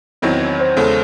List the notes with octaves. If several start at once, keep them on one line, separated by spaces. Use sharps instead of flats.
E2 D#3 F#3 C4 E4 D#5
C#5
C5
E2 C#3 G#3 A4